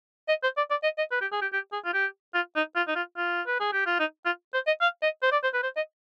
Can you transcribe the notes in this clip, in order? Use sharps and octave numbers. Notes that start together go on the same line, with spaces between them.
D#5
C5
D5
D5
D#5
D#5
B4
G4
G#4
G4
G4
G#4
F4
G4
F4
D#4
F4
D#4
F4
F4
B4
G#4
G4
F4
D#4
F4
C5
D#5
F5
D#5
C5
D5
C5
B4
C5
D#5